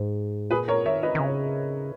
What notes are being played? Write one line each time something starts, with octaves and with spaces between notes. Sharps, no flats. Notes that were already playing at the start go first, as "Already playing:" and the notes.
Already playing: G#2
A#2 G#4 B4
A#4 C#5
D#3 C#5 E5
B4 D#5
D#3
C#3